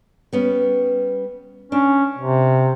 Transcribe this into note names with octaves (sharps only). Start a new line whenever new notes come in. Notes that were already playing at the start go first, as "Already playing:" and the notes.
G3 B3 C#4
C#4 D4
C3